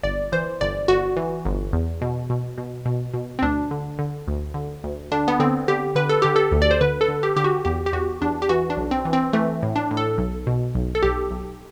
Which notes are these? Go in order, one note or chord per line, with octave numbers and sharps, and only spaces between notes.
G1 D5
E3 C5
G1 D5
G1 F#4
E3
G1
E2
B2
B2
B2
B2
B2
C4
D2 D4
D3
D3
D2
D3
D2
D3 D4
B3
D3 C4
D3 G4
D3 B4
A4
D3 G4
A4
D2
D5
C5
D3 B4
A4
D3
G4
D3 G4
F#4
E2 G4
G4
E2 F#4
E2 D4
G4
E3 F#4
D4
B1
C4
E3
C4
E3 A3
A2
D4
A2
A4
B1
B2
B1
A4
B1 G4
B1